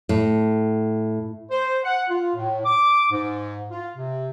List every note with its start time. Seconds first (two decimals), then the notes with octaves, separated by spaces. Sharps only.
0.09 A2
1.51 C5
1.84 F#5
2.09 F4
2.35 A2
2.65 D6
3.11 G#2
3.70 F4
3.96 C3